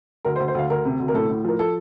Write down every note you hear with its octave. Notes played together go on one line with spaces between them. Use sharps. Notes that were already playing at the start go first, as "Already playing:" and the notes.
D2 A#4
C5
D2
C5
D2 F5
D2 A#4
C3
D2
A#4
A2 A4
A2
F3 A#4
F3 A4